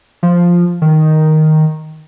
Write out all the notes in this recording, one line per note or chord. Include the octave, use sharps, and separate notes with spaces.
F3
D#3